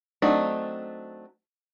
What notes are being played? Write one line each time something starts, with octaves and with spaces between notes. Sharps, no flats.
F#3 A3 C4 D4 D#4